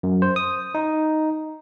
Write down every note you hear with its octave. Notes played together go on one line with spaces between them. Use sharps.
F#2
C5
D#6
D#4